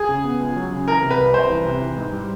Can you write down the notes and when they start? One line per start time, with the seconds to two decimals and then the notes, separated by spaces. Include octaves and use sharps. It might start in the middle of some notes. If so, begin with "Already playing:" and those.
Already playing: G#4
0.09 C#3
0.24 B3
0.40 C#2
0.56 F#3
0.71 C#3
0.87 E3 A#4
1.02 C3
1.10 B4
1.18 C2
1.34 C2 C5
1.50 E3
1.65 C3
1.81 E3
1.97 G#2
2.12 G3